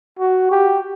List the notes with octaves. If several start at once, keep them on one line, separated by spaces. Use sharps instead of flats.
F#4
G4